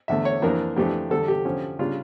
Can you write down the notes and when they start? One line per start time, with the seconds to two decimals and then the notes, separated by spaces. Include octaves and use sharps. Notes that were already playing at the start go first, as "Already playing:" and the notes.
0.08 E2 D3 A3 E5
0.25 C#5
0.42 F2 E3 A#3 D4 A#4
0.77 F2 E3 A3 D4 G4
1.10 E2 D3 G3 A4
1.28 G4
1.45 F2 D3 F3 C#4
1.79 C#3 G3 D4 F4